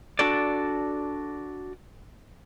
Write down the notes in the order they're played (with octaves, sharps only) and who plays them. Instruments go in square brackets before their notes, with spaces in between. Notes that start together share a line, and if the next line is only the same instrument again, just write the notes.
[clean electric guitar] D4 F#4 A4 D5